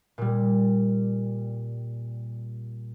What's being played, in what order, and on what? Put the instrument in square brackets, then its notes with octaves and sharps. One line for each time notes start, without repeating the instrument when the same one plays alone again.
[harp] A#2 G3